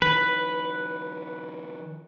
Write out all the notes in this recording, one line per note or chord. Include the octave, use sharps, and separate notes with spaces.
D#3 F3 B4